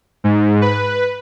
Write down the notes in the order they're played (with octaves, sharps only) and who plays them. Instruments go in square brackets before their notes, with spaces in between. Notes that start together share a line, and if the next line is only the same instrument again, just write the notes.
[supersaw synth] G#2
B4